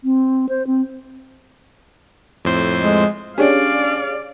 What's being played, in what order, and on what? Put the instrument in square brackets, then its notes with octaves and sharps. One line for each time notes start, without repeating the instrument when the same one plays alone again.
[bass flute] C4
C5
C4
[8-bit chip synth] F2 A2 C5
[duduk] G#3
[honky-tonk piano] C#4 D4 [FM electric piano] G4 G#4 C#5 [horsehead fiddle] D5 F5